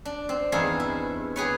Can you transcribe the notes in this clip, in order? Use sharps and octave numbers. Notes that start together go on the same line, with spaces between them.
D4
C4
E2 G2 D#4 G#4 E5 F5
E4
G4 G#4 B4 C#5